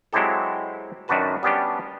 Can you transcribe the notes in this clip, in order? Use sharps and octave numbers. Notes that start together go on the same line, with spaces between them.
F#3 G#3 C4 E4 G4 A4
F#2 D#3 D4 F#4 B4 A5
G3 B3 C#4 D4 G4